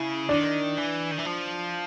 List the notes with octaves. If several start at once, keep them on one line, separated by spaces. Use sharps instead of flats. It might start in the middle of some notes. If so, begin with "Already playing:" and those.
Already playing: C#3 E4
D#3 D4
E3
D#3
E3
F3